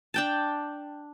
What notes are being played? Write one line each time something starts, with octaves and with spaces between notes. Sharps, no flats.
D4 G5 A5